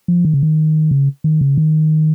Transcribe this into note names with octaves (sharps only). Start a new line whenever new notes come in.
F3
D#3
C#3
D#3
C#3
D#3
C#3
D#3